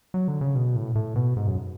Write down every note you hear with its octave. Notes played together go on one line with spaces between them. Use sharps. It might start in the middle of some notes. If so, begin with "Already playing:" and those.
F#3
D3
C#3
B2
A2
A2
B2
G#2
F#2